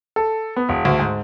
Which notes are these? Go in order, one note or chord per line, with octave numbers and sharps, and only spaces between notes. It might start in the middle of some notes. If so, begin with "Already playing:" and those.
A4
B3
E1
D2
G#2